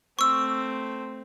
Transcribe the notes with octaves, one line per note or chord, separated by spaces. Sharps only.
A3 C4 C#6 E6